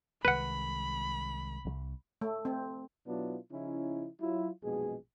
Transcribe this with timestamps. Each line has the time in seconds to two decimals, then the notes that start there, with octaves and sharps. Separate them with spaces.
0.25 C2 D#3 G#3 B4 F#5 B5
1.65 C2
2.21 A3
2.45 C4
3.07 B2 F#3 B3 D4 E4 F4
3.51 C#3 F3 C#4 D#4 E4
4.21 F#3 E4 F4
4.64 A#1 F#2 B2 G#3 G#4